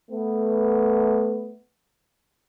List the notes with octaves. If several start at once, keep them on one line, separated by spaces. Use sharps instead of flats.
A3 B3